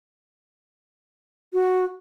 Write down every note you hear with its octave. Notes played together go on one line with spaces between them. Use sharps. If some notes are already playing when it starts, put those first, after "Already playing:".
F#4